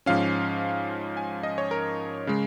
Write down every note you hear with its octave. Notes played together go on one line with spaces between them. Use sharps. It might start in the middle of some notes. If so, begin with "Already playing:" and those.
G#2 F3 C#4 F5
G#5
D#5
C#5
A#4
C#3 G#3